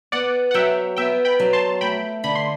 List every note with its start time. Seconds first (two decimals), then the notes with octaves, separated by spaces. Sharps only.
0.12 B3 D5 F#5
0.51 F#5
0.54 F#3 E5 G5
0.97 B3 E5 G5
1.25 G5 B5
1.40 F#3
1.53 A5 C6
1.81 A3 G5 B5
2.24 D3 B5
2.35 C6